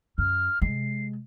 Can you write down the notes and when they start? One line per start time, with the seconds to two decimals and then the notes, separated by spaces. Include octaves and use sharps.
0.18 F#2 F6
0.62 C3 G#3 C7